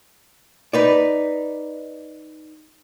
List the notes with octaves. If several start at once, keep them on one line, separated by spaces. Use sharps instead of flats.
D#4 B4 D5